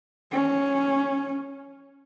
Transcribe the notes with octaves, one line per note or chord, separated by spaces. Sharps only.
C#4